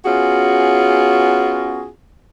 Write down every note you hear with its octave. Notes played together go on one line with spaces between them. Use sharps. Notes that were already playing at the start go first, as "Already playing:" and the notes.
B3 C#4 F4 F#4 G#4